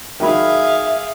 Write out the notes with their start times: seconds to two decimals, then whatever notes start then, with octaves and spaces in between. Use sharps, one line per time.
0.20 D#3 F#3 G#4 A#4 E5 F5 B5